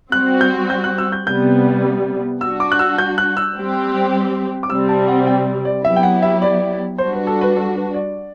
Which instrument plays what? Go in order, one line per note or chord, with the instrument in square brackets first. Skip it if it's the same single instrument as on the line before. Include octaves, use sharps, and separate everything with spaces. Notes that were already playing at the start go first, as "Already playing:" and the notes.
[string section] G3 C4 F#4 [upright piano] F#6
[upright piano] G6
G6
F#6
E6
G6
[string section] C3 G3 B3 [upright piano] G6
[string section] G3 D4 F#4 [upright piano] E6
[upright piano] D6
F#6
E6
G6
F#6
E6
[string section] G3 C4 G4
[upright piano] D6
[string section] C3 G3 C4 [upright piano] E6
[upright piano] A5
F#5
G5
D5
[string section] F#3 B3 E4 G4 [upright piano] E5
[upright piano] G5
F#5
E5
D5
[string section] G3 D4 F#4 [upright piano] C5
[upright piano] B4
A4
B4
A4
B4
D5